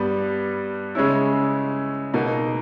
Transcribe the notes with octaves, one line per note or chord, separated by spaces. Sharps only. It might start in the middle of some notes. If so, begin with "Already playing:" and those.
Already playing: G2 G3 B3
C#3 G#3 C#4 E4
B2 A#3 D#4